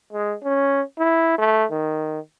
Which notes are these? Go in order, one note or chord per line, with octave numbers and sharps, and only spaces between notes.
G#3
C#4
E4
A3
D#3